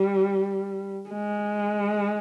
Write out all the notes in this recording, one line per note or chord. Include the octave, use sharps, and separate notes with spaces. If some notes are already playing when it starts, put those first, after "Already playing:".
Already playing: G3
G#3